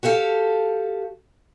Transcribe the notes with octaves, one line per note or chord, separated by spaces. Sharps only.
F#4 G4 A4 F5